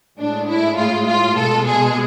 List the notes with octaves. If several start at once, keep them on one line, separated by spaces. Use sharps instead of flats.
A2 G#3 D4
E4
F4
F4
B2 G#3 A4
G#4